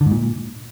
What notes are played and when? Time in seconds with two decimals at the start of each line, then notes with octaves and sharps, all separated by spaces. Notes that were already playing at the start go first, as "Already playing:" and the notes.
0.01 D3
0.06 G#2
0.12 A#2